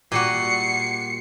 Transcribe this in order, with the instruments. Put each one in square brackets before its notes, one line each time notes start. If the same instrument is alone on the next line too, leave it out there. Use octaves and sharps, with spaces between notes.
[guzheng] A#2 G3 F#4 [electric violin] C7 C#7